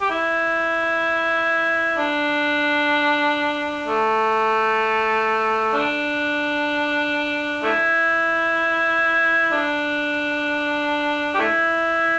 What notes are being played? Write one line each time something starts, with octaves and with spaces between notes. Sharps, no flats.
G4
E4
D4
A3
D4
A3 E4
D4
G4
A3 E4